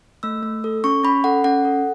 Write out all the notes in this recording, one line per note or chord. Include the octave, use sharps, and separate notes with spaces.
A3 E6
A3
A4
C#4 C#6
C#4 B5
A4 F#5
C#4 F#5
A4